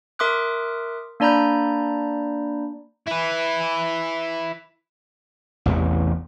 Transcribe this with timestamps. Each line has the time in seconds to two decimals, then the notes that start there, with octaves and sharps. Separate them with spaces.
0.19 A#4 E5 C6 D6 D#6 F#6
1.20 A#3 D4 D5 A#5 B5 G6
3.08 E4 B4
5.66 A1 E2 C3 E3